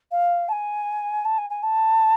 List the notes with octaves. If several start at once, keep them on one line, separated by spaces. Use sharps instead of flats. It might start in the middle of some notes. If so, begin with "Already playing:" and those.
F5
A5
G#5
A5
G#5
G#5
A5